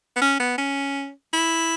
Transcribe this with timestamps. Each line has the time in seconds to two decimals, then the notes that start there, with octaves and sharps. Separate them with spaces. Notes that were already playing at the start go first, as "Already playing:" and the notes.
0.16 B3
0.22 C#4
0.40 B3
0.58 C#4
1.33 E4